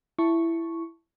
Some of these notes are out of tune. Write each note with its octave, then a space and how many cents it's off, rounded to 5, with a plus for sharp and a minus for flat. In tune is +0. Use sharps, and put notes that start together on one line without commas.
E4 +10 A5 +0 C#6 +0